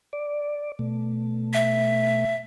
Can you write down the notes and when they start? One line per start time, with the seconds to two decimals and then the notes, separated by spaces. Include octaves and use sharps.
0.13 D5
0.79 B2 A3
1.53 E5